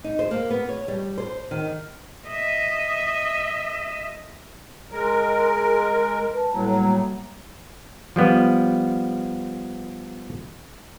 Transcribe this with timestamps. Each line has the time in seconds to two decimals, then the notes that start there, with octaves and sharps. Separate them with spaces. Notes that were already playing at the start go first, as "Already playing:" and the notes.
0.04 D#4
0.19 C5
0.31 A#3
0.50 B3
0.69 C#5
0.88 G3
1.18 C5
1.51 D#3
2.27 D#5 E5
4.92 G#3 A#4
6.33 B4 A5
6.53 A2 F#3 G3 A#3 A#5
8.16 F3 G3 B3